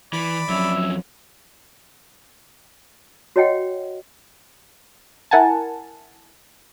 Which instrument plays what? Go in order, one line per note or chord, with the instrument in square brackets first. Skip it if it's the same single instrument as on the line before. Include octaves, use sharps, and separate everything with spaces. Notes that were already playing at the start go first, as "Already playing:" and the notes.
[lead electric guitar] E3 [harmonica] D5 B5
[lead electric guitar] F2 C#4 [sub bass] F#3 [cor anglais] E5
[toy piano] F#4 C#5 D#5 F#5 G5
[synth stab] E4 A#4 F#5 G#5 A5